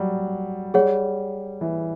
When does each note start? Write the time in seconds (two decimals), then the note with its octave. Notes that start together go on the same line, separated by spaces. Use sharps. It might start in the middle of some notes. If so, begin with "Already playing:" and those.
Already playing: F#3 G3
0.74 G3 G#4 C#5 F#5
1.61 E3